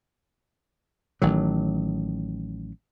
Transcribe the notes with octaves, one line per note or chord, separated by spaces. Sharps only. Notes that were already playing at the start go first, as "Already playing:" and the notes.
A1 D#3 F#3